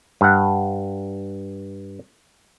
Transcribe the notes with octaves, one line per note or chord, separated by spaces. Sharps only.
G2 F#5